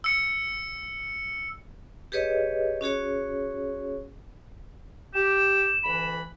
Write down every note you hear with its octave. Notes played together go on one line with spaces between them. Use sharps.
E6 C#7
G4 G#4 B4 C#5 D#5
C#4 F#4 G#4 C#5
G4 E7
D2 E3 B5